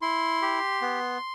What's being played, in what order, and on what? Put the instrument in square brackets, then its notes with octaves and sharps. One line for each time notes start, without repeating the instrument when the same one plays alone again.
[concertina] E4 C6
G4
B3